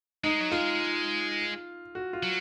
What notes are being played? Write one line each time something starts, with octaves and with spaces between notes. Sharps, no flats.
G#3 D#4
F#3
G#3 F4
F#4
F4
F#3